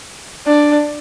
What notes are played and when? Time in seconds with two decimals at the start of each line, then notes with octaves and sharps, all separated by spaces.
0.47 D4